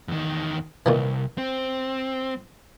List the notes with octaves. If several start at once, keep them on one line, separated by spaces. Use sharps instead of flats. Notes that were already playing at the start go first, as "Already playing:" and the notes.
E2 D#3
C2 A#2 D#3 E3
C4